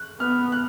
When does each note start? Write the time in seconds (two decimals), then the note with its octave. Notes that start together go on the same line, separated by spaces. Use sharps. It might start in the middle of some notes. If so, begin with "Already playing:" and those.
Already playing: F#6
0.20 B3 F6
0.52 F#6